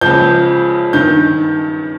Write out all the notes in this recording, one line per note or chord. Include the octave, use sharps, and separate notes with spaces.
C#2 C#3 F3 G6
G2 D#3 G6